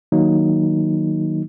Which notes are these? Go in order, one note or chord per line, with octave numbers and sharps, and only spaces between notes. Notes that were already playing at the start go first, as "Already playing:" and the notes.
D#3 F#3 A#3 D#4